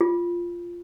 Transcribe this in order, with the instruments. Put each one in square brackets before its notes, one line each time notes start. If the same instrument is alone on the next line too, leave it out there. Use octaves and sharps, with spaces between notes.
[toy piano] F4